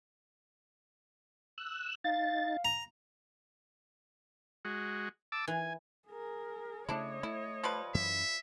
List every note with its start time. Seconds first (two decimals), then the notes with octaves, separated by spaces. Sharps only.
1.58 E6 F#6
2.04 D#4 F5 A6
2.65 A#5
4.65 G#3 F#4
5.32 A5 D6 E6
5.48 E3 G#5
6.09 G#4 A#4
6.89 C#3 A3 D4 E4 C#5 D#5
7.23 A3 E4
7.64 F3 G3 B4
7.94 F#2 E3 E5